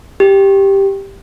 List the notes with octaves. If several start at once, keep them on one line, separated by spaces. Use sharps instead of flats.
G4